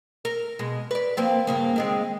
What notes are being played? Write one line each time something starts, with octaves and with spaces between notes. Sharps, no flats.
A#4
B2 G#3
B4 D5
F3 A#3 C4
G2 C#3 A#3
D#3 G#3 C4